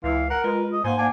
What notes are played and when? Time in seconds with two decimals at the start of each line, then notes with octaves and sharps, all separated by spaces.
0.04 C#2 E3 F5
0.30 A#4 F#5
0.44 G#3 F4 B4
0.72 D#5
0.84 G#2 A#3 C5 F5 F#5 G#5
0.98 D4 C5 G#5